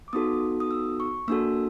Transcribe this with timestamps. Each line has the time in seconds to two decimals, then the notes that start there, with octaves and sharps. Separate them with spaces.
0.08 D6
0.13 B3 D#4 F#4 A4 D#6
0.60 D#6
0.71 E6
1.00 C#6
1.28 A#3 D4 F#4 A4 E6